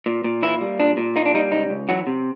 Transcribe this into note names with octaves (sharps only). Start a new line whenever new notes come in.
A#2
A#2
E3 A#3 E4
G3
A#2 D4
A#2
A#3 D#4
D4
G3 D#4
C#2 D#4
C#2
E3 F#3 F#4
C3